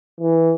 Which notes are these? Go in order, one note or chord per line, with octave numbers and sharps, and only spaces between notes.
E3